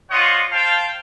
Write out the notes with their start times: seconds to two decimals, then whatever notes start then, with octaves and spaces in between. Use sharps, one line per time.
0.11 D4 F4 C5 C#5 D#5 F#5
0.52 C5 F5 G5 A5